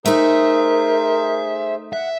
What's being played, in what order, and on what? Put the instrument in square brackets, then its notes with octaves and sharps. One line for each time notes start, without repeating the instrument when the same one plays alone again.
[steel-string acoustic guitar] A3 D#4 [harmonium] G#4 C5 [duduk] A#4 [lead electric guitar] E5
[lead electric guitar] E5 [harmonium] F#5